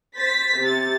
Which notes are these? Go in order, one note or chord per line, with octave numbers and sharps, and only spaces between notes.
C5 A6 B6
C3 A6